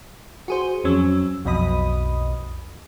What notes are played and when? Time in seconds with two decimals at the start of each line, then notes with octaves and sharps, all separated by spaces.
0.48 F#4 G#4 C5
0.84 F2 F#3 C#4 E6
1.45 B1 F2 B2 D#5 B5 D#6